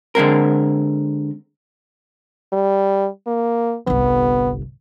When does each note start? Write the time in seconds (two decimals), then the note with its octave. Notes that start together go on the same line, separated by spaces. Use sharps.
0.15 D3 G#3 C4 A#4
2.52 G3
3.27 A#3
3.87 G1 C2 B3